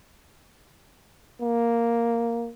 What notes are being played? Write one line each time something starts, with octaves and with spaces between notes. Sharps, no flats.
A#3